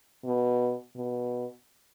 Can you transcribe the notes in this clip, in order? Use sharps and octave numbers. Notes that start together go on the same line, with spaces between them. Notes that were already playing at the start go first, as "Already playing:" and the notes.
B2
B2